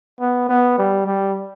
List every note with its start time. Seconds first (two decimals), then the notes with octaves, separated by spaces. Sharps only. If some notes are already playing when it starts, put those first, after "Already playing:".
0.21 B3
0.49 B3
0.78 G3
1.07 G3